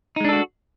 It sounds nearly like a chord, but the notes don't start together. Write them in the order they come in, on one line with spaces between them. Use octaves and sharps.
D#4 G#3 D4 A4 F#4